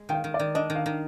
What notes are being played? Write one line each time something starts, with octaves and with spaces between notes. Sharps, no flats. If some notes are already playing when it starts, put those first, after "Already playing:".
Already playing: G#3
D#3 G5
F5
D#3
D5
D#3
D4 D#5
D#3
F5
D#3